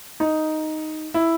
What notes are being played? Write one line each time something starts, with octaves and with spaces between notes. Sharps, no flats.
D#4
E4